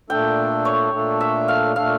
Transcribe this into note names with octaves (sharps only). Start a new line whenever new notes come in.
A#2 A3 D4 A4 G5
C#5
A#2 A3 D4 A4
E5
F5
A#2 A3 D4 A4 F5